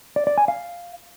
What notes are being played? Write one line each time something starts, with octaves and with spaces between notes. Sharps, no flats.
D5
D5
G#5
F5